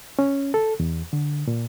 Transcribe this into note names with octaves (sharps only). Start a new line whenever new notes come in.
C#4
A4
E2
D3
A#2